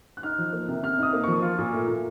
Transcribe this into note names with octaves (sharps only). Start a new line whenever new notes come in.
F#6
D#4 F6
F3
A#3
C3
C3 F6
D#4 D#6
A#3
F3 C#6
F4
A#2
A3
A#2